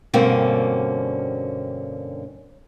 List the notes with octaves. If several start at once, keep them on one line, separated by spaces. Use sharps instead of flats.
G2 B2 D3 A#3 C4 C#4